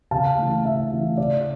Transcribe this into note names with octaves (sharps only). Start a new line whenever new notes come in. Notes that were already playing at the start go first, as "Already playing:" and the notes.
C#3 F5 A5
E3 A3
C#3 E5
E3 A3
C#3 D5